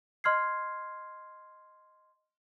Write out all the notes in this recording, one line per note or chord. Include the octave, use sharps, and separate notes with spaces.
D#5 C6 F6 G#6 C7